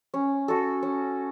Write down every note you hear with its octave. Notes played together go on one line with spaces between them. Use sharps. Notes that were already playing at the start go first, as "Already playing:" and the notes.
C#4
F#4 A4
C#4